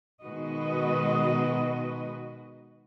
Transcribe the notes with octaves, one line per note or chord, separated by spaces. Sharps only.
B2 D#3 G#3 F#4 B4 D#5